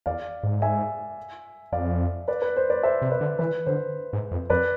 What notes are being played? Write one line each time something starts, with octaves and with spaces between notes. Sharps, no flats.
E2 D5 F5
G#2
E5 G#5
F2 D5 F5
B4 D5
B4
C5
B4 D5
C5 E5
C3
B4 D5
D3
E3 B4
D3 C5
G#2
F2
F2 B4 D5